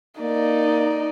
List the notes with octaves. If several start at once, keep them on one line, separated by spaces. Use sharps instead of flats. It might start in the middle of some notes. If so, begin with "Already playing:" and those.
A#3 D#4 D5